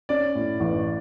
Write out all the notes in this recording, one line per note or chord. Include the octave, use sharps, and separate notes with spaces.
C#4 D5
A2
A1